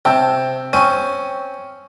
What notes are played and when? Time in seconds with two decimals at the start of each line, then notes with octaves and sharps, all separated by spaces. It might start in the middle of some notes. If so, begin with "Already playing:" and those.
0.05 C3 G5 A5 E6
0.73 C4 C#4 C#6 D#7